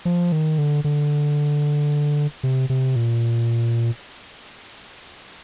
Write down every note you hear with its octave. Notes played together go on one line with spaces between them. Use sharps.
F3
D#3
D3
D3
C3
C3
A#2